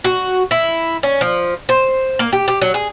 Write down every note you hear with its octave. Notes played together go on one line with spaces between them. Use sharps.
F#4
E4
C#4
F3
C5
A#3
G4
G4
F#3
G#4